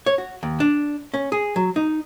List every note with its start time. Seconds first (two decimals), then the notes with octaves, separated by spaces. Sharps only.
0.06 C#5
0.18 F#4
0.43 D#2
0.60 D4
1.14 C#4
1.32 G#4
1.56 F#3
1.76 D#4